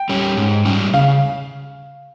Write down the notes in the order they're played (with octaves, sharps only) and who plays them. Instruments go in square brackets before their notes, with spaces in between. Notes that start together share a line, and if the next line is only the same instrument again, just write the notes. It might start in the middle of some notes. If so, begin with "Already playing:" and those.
Already playing: [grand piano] G5
[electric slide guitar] G3 C#4
G#2
G3 C#4
[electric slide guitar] C#3 [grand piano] F5